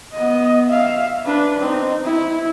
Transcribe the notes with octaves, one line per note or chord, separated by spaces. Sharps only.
B3 D#5
E5 F5
D4 B4
C4 D#4
E4